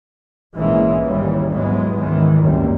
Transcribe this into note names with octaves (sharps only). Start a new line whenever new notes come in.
A#1 G#2 E3 G#3 A#3 C#4
D#2 G#2 C#3 E3 G3
G#2 E3 F#3 G#3 B3
C#2 G#2 D#3 E3 G#3
G#1 C#2 F#2 G3 A#3